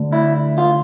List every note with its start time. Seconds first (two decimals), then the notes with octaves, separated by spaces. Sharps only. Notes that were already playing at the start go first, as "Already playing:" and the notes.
Already playing: D2 D3 A3
0.13 E4
0.58 F4